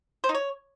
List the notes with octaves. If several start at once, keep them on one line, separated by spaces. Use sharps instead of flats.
C5
D#4
C#5